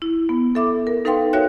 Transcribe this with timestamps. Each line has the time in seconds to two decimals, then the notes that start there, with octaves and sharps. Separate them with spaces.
0.02 E4
0.29 B3
0.55 A4 E5 D6
0.87 A#4
1.05 D#4 A4 B4 F5 G5 C6
1.33 F#4 A#4 C#5 E5 G5 F#6